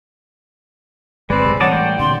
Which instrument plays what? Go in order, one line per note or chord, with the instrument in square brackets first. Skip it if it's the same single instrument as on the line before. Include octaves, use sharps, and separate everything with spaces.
[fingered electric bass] G1 [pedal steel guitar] G#3 C4 [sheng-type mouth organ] B4 D5
[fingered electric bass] B1 C3
[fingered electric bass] A2 E3 G3 [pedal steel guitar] D#4 D5 A5 [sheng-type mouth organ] C#5 [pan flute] F#5
[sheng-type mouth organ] D5 [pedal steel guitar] G5
[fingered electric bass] A#2 D3 C4 [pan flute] C6